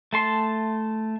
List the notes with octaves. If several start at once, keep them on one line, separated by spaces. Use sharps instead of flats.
A3 A5 C6